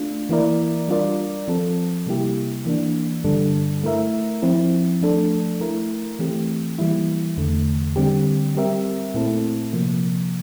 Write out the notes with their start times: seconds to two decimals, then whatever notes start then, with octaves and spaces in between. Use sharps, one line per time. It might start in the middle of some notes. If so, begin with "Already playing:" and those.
Already playing: A3 D4 F4
0.29 E3 A#3 E4 A#4 D5
0.88 G3 D4 F4 A#4 D5
1.48 F3 C4 F4 A4
2.06 C3 G3 A#3 E4 G4
2.66 E3 A#3 D4
3.24 G2 D3 G3 D4 A4
3.84 A3 E4 A#4 E5
4.42 F3 C4 E4
5.01 F3 A3 D4 A4
5.60 A3 E4 A#4
6.19 E3 A3 C4 G4
6.79 E3 G3 A#3 E4
7.37 E2 D3 A3
7.96 D3 G3 C4 G4
8.55 G3 C4 G4 A#4 E5
9.14 A#2 A3 C4 E4 A4
9.73 C3 F3 A#3